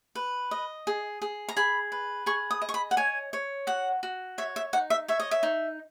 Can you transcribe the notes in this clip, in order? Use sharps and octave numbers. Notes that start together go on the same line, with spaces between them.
B4
D#5
G#4
G#4
A#5
G#4 B5
B4
G#4 C#6
D#6
D#5
C#6
B5
F#5
C#5 G#5
C#5
F#4 F#5
F#4
C#5 E5
E5
D#4 F#5
E5
C#5 E5
D#5
E5
D#4